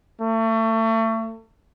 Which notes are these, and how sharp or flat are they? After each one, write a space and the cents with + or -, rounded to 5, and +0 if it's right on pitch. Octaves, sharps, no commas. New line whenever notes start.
A3 +30